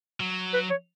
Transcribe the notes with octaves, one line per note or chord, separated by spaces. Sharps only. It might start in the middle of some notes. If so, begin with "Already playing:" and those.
F#3
B4
C#5